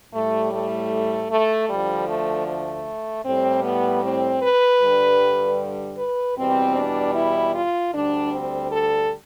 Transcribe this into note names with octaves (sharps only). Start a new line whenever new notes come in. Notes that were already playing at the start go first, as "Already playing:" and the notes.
A2 G3 A3
A3
A3
D2 D3 F3 G3
A3
A3
A2 G3 C4
B3
C4
B4
G2 D3 G3
B4
E2 B2 G3 C4
D4
E4
F4
D2 D3 G3 D4
C4
A4